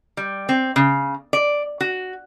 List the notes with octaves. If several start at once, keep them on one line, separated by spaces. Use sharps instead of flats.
G3
C4
C#3
D5
F#4